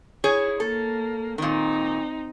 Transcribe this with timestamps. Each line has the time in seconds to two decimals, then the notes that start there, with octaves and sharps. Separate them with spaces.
0.24 E4 G#4 C#5
0.60 A#3 A4
1.38 A#2 D#3 C4 D#4